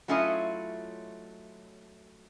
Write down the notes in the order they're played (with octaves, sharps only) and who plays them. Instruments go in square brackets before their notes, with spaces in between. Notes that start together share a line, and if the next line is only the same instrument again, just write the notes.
[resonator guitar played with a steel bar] F#3 A3 C#4 E4 F4 D#5